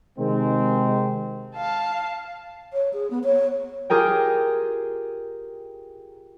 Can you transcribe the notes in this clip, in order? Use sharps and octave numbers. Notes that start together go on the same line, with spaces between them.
C3 D#3 G#3 C4
F5 A5
C#5
G#4
B3
C#5
F4 G4 G#4 A#4 G5